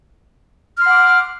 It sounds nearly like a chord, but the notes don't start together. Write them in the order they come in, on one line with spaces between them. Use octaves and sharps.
F6 C6 F#5 D6